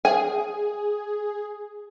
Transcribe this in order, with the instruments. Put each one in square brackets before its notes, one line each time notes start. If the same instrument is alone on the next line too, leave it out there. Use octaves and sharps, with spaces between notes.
[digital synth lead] G#4 [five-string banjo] G#5